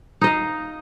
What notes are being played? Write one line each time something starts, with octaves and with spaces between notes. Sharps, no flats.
D#4 D#5 F5